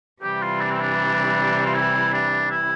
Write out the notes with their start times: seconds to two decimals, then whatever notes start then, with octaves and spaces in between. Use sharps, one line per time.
0.22 C3 E3 G3 G4
0.42 F4
0.61 D4
0.71 C4
0.80 D4
1.65 F4
1.74 E4
2.13 D4
2.51 E4